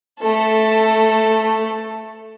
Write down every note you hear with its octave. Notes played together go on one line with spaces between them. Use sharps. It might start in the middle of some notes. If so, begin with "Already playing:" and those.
A3 A4